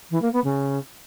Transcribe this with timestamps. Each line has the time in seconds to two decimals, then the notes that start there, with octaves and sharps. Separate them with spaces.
0.10 E3
0.22 A#3
0.33 B3
0.44 C#3